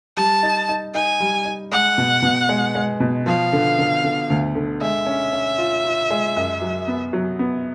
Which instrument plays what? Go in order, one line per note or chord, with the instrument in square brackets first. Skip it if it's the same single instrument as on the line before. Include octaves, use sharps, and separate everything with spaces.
[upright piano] G3 [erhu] A5
[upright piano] D#4
D#4
[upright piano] D#4 [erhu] G#5
[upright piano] G3
D#4
[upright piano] G#3 [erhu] F#5
[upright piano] B2
B2
G#3
G#3
B2
[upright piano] F3 [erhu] F5
[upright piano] D3
D3
D3
D2
D3
[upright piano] G#3 [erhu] E5
[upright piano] C#4
C#4
F4
F4
G#3
F#2
F#3
B3
F#3
B3